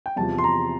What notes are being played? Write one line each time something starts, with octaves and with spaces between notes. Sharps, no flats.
G5
E2 C3 F3 A5
C6
A#5